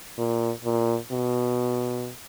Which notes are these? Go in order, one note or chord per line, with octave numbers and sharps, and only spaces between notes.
A#2
A#2
B2